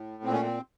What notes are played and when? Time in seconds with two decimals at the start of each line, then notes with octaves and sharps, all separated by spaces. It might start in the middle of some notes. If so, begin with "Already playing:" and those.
Already playing: A2
0.24 A#2 C4
0.33 C#4
0.42 C4